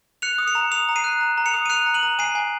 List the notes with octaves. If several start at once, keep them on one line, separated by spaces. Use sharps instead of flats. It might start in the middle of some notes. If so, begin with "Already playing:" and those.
F#6 C#7 F7
D#6
C#7 F7
A#5
D#6 C#7 F7
A#5
C7 D#7
F#6
A#5
A#5
C#7 F7
D#6
D#7
F#6 C#7 F7
A#5
D#7 F#7
A#5
G#5 C7 D#7
G#5